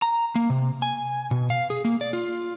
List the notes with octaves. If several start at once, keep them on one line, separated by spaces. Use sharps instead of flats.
A#5
A#3
C3
G#5
B2
F5
G#4
A#3
D5
F4